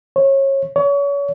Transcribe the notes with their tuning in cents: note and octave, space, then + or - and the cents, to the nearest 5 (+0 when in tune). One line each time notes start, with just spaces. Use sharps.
C#5 -25
C#5 +35